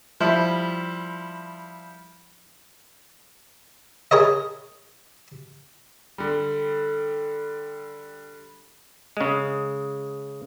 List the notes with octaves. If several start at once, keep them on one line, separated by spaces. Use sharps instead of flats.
F3 G3 E4
G#4 A#4 C#5 D#5
D3 G3
C#3 G#3